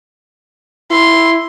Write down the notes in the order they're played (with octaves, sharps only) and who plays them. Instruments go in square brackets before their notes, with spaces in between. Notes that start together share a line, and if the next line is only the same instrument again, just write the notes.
[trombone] E4 [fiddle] C6